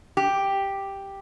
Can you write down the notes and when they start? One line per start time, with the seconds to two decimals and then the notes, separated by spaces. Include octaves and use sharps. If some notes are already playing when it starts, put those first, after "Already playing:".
0.17 G4